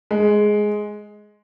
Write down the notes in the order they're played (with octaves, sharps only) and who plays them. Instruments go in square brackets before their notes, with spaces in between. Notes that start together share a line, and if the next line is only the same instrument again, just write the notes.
[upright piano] G#3